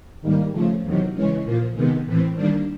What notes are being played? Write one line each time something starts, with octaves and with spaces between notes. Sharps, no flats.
G#2 D#3 G3 A#3
C#3 F3 A3
E2 C3 D#3 F#3
C#3 E3 G#3 C#4
A#2 F3 A#3
C3 D#3 G#3 B3
A2 E3 A3 C4
D#3 G3 A#3 D4